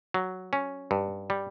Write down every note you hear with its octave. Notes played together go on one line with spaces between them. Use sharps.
F#3
C#4
G2
G3